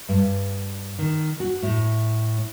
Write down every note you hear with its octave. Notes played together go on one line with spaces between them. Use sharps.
G2
D#3
F#4
A2